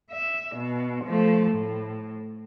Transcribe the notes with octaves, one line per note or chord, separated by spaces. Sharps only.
E5
B2
F3 A3
A2